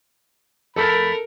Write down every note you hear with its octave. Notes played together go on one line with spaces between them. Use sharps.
F2 A3 A4 A#4 B5 F6